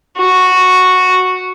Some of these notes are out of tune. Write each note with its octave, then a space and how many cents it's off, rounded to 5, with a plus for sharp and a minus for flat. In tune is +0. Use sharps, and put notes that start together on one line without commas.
F#4 -5